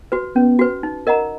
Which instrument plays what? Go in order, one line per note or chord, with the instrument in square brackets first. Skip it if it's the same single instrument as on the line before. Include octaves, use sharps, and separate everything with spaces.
[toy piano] F#4 B4
[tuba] B3 [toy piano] C#4
[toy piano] F#4 B4
D#4
A#4 D#5 F#5 A#5